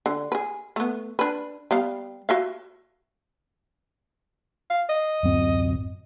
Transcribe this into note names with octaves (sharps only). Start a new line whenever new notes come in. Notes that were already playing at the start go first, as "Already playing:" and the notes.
D3
G#4 B4
A3 B3
D4 B4
G3 B3 F5
F#4 E5 F5
F5
D#5
D1 F#2 C4